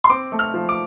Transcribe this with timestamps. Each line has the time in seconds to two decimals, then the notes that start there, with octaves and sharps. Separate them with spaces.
0.04 C6
0.10 C4 D6
0.32 A3
0.39 F6
0.54 F3
0.69 D6